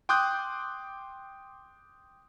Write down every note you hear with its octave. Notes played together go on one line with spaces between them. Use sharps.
G5 C6 D6 D#6 F#6 G6